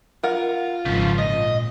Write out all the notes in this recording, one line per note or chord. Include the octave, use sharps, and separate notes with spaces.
F4 A#4 F#5
G#1 C#3 F3
A#2 D#5